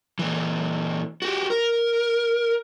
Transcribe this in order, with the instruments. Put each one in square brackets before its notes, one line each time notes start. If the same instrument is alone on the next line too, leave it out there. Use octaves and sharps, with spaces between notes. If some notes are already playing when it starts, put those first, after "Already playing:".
[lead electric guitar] A#2 E3
F#4 G4
A#4